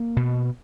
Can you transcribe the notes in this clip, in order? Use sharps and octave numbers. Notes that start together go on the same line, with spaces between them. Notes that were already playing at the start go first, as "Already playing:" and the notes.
Already playing: A#3
B2